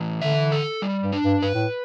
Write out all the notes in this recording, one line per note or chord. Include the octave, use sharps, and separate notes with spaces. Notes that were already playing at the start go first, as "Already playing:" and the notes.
Already playing: A2 E3
D3 E5
A4
G3
G2
D4
G2
G2 B4
A2